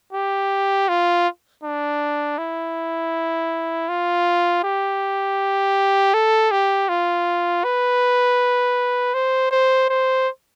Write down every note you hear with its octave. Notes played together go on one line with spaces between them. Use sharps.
G4
F4
D4
E4
F4
G4
A4
G4
F4
B4
C5
C5
C5